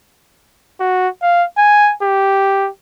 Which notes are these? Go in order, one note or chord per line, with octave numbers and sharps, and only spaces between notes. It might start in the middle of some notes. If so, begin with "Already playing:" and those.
F#4
F5
G#5
G4